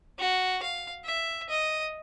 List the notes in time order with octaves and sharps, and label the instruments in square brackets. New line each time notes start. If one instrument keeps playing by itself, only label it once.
[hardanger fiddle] F#4
F5
E5
D#5